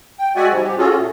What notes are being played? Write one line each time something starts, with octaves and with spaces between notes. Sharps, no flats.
G5
G#3 F#4 D5 E5 F#5 G#5
G#2 C3 F3 G3
G4
C#4 F4 F#4 G#4 A4
A#2 A3